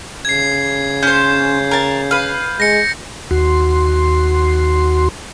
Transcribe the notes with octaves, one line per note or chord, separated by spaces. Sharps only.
C#3 G#6 C7
C#4 C5 G6
A#4 A5
B4 F5
G#3 A#6 C#7
D#2 F#4 C6